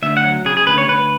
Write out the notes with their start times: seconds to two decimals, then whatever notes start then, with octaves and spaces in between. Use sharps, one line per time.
0.02 D2 E5
0.17 F#5
0.24 F#3
0.45 C#3 G#4
0.57 G#4
0.67 D2 B4
0.78 C#5
0.88 D2 B4